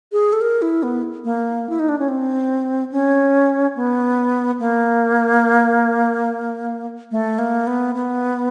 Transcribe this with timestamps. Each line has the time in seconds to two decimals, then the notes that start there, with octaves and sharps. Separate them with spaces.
0.12 G#4
0.33 A4
0.41 A#4
0.62 E4
0.83 B3
1.24 A#3
1.70 E4
1.79 D#4
1.89 D4
1.99 C#4
2.08 C4
2.92 C#4
3.76 B3
4.60 A#3
7.11 A3
7.39 A#3
7.67 B3
7.95 B3